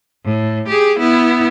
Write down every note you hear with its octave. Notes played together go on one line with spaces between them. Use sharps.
A2
G4 G#4
B3 E4